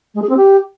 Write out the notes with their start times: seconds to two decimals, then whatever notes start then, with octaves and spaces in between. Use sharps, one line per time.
0.15 G#3
0.22 G#4
0.29 C4
0.37 G4